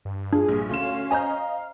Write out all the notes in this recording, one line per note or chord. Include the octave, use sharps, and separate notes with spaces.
G2
D4 F4 G#4
A#1 G2
D2 C#4 F5 C6 E7
C5 D#5 G#5 A#5 G6